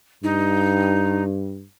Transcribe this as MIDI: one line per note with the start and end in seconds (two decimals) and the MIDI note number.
0.23 1.65 43
0.23 1.23 63